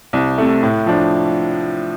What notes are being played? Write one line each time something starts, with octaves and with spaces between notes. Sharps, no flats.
C2
C3 A3
A2
F3 D4